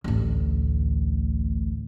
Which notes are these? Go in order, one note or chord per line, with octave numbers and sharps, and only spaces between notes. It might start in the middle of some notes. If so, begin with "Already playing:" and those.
A1 D2